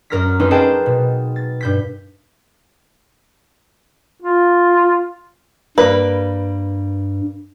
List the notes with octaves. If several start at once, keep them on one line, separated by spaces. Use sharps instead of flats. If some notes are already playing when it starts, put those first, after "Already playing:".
F#2 A#4 F6 A#6 B6
C4 C#4 D#4 G4 B4
G#4 B4 C5 D#5 G5 A5
B2
A6
G2 G6 B6
F4
G2 G3 A#3 B4